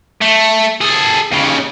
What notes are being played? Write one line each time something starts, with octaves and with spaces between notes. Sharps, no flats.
A3
G#4 A4
D#2 C#3